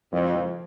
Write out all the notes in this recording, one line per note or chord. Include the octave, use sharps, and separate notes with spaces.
F2 F3
F3